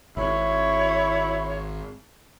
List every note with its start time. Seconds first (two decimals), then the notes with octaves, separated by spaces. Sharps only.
0.17 G#1 E4 C#5